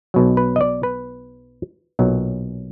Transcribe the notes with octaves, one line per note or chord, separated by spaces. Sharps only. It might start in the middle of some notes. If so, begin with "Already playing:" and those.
B1 B2 F#3
B4
D#5
D5
B4
B1 A#2 F#3